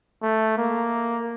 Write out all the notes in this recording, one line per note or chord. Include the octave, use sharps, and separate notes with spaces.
A3
A#3